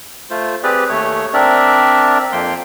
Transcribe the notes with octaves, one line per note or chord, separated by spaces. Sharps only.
A3 F4 C5
C4 G4 G#4 B4 D5
D#2 A3 C#5
C4 D4 A#4 D5 E5
F2 F3 A#3 G5 C6